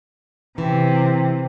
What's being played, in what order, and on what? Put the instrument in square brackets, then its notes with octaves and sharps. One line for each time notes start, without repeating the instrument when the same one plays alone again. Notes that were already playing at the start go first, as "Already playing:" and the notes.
[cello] C3 [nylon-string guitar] E3